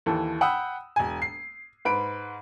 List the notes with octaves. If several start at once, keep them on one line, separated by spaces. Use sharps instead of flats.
D#2 E3 A4
F#5 G5 B5 D#6 E6
E1 G#5
C7
G#2 B4 B5 D7